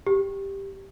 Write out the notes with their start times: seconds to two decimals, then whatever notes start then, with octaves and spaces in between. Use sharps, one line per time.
0.07 G4